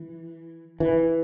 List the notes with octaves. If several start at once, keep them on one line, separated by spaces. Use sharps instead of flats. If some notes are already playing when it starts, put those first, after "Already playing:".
Already playing: E3
E3